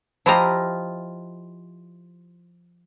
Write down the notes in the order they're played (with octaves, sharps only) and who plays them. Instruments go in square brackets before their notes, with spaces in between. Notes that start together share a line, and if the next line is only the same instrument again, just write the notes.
[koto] F3 E4 F4 G4 D#5 A#5